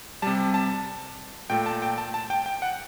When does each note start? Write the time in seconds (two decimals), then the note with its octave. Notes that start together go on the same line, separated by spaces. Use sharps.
0.22 C3 G3 A5
0.54 A5
1.50 A#2 A3 G5
1.66 A5
1.82 G5
1.98 A5
2.14 A5
2.30 G5
2.46 G5
2.62 F#5